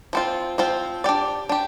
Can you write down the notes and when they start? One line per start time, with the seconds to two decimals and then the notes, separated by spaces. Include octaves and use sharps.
0.13 F3 C4 F4
0.58 F3 C4 F4
1.04 D4 G4 D5
1.49 D4 G4